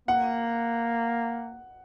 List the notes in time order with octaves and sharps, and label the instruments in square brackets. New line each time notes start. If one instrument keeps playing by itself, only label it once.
[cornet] A#3 [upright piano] F#5